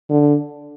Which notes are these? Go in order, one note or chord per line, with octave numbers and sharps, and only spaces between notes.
D3